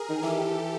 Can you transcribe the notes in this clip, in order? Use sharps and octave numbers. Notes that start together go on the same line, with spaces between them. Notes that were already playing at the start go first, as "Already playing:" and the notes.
Already playing: G#4 A#4
D#3
E3 G4 A4